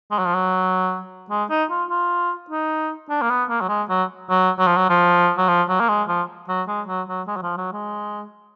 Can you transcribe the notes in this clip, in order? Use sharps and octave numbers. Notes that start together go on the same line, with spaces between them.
G#3
F#3
F3
F#3
G#3
D#4
F4
F4
D#4
D4
A#3
B3
A#3
F#3
G#3
F#3
F#3
F#3
F3
F#3
F3
F#3
F3
F#3
A#3
G#3
F3
F#3
G#3
F#3
F#3
G#3
F#3
F3
F#3
G#3